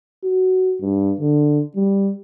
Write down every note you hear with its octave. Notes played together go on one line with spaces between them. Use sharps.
F#4
G2
D3
G3